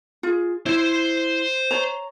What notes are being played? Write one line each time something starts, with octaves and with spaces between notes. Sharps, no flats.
F4 G#4
E4 C5 C6
C#5 A#5